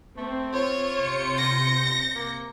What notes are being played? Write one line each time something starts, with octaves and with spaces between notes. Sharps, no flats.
A3 C4
F4 C#5
C3 G6 C#7
A#6
A#3